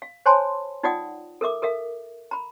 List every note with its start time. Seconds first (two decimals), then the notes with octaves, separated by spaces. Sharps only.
0.02 F5
0.26 C5 C#5 G#5 A5 B5 C6
0.83 D#4 F4 D5 F#5 G5 D#6
1.41 A4 A#4 E5 D6
1.62 A4 A#4 E5 F5
2.31 A#5 B5